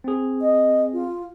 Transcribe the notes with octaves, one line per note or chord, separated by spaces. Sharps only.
C4 G#4
D#5
F4